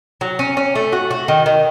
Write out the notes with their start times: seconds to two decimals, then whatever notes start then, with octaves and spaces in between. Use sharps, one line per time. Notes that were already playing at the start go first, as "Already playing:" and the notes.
0.21 F#3
0.39 C#4
0.57 C#4
0.75 A3
0.93 F#4
1.11 F#4
1.28 D#3
1.46 D#3